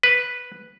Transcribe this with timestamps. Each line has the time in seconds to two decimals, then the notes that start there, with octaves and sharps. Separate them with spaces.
0.03 B4